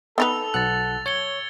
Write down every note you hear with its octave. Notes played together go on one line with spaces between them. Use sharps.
B3 D#4 A4 B4 E6 F7
B1 F#5 E6 F#6 A6
C#5 G#6 C#7 G7